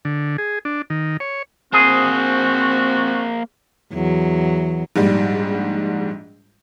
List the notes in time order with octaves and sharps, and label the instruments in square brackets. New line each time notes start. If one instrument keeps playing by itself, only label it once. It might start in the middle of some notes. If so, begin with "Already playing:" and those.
[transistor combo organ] D3
G#4
D4
D#3
C#5
[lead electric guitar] A#3 C5 [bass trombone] C4 [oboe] F#4 [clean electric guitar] G#4
[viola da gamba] E2 F#3
[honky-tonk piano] A#1 G#2 G3